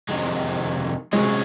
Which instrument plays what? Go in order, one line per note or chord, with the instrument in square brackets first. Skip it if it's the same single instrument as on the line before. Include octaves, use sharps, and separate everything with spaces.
[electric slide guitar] F2 C3 D#3 G#3
[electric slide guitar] C3 F#3 C#4 G#4 [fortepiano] G#3